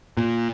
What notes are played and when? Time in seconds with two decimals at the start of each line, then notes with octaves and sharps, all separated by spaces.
0.17 A#2